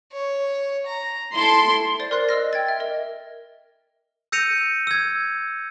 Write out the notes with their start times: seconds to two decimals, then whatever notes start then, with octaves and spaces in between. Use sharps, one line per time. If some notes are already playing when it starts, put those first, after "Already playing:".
0.12 C#5
0.86 A#5
1.33 E4 A4 C6
1.99 C5 D5 A6
2.11 A#4 D5 C6 F#6 A6 C7
2.29 D#5 E6 F6 A#6
2.53 G5 G#6 A6
2.68 E5
2.80 A#4 D#5
4.32 E6 G6 A#6 C#7 D#7 F7
4.87 E6 G#6